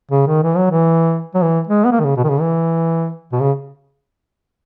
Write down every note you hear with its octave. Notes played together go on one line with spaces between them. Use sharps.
C#3
D#3
E3
F#3
E3
F#3
E3
G#3
B3
A#3
D#3
C#3
B2
D#3
C#3
E3
B2
C#3